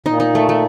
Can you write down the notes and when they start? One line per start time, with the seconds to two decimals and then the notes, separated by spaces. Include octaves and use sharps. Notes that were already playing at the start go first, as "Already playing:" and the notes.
0.06 A#2 D#4
0.20 D#4
0.35 A3
0.49 A3